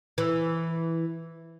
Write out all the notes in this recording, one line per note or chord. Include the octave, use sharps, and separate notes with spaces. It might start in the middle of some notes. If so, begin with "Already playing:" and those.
E3